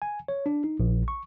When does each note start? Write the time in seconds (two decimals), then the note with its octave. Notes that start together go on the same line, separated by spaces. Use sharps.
0.02 G#5
0.28 C#5
0.46 D4
0.64 D#4
0.80 A#1
1.08 C#6